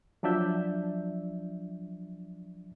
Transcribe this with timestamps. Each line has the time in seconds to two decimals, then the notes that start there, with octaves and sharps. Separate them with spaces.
0.23 F3 F#3 D4 D5 E5 G6